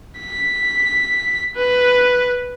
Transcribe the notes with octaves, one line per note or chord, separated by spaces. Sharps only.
B6
B4